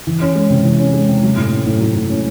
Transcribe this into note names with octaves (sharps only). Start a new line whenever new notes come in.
E3
C#4
G#3
C3
E3
C#4
G#3
C3
F#3
A2
C#4
A2
F#3
A2
C#4